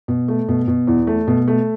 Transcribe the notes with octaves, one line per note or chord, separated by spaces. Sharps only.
B2
A3
B2
B2
E2
A3
B2
A3